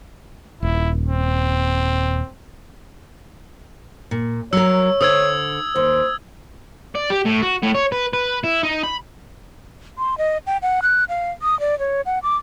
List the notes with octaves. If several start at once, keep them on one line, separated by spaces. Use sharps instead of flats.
D#1 E4
C4
A#2
F#3 A#4 C#5 E6
D3 C5 D#6 E6 G#6
D#2 C5
D5
G4
A2
F#4
A2
C#5
B4
B4
E4
D#4
B5
C6
D#5
G5
F#5
F#6
F5
D#6
D5
C#5
F#5
D6